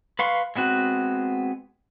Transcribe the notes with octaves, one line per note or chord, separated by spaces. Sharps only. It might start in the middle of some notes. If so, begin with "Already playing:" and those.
B4 F5 C6 C#6
G#3 B3 C4 F#4